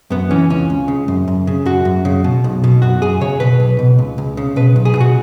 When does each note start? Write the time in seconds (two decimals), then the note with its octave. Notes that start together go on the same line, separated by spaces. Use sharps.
0.10 F#2 B3
0.31 E3 C#4
0.50 C#2 C#4
0.70 C#2
0.88 C#3
1.08 F#2
1.28 F#2
1.47 C#3
1.66 F#2 F#4
1.85 F#2
2.05 C#3
2.24 B2
2.44 B1
2.64 B2
2.82 F#2 F#4
3.02 F#2 G#4
3.21 C#3 C#5
3.40 B2 B4
3.60 B1
3.79 B2
3.99 C#2
4.18 C#2
4.37 C#3
4.56 B2 B4
4.76 B1
4.85 G#4
4.96 B2 F#4